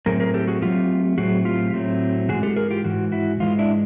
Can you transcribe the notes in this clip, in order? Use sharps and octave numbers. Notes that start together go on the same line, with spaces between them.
A2 F#3 A3 C4 G#4 A#4
G#4 A#4
G4 A4
F#4 G#4
A2 F#3 A3 C4 F4 G4
A2 F#3 A3 C4 F#4 G#4
F4 G4
A2 F#3 A3 C4
G#2 E3 G#3 F#4 G#4
G4 A4
G#4 A#4
F4 G4
G#2 E3 F#4
E4 F#4
G#2 E3 G#3 F4
D4 E4